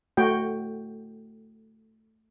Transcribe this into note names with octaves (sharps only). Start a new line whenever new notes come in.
A3 F#4 G5